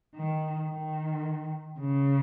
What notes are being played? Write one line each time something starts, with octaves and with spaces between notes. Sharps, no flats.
D#3
D#3
C#3